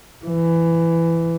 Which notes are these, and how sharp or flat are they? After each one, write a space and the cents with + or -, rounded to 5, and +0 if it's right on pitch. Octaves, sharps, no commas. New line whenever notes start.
E3 +15